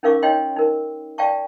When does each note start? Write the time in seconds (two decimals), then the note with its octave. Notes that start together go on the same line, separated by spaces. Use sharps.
0.03 C#4 D#4 A#4 F5 C#6 D6
0.23 D#4 C#5 D#5 F5 G5 C6
0.56 D#4 A#4
1.18 D5 F5 G5 A5 C#6